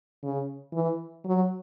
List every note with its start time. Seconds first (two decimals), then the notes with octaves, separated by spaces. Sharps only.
0.23 C#3
0.73 E3
1.25 F#3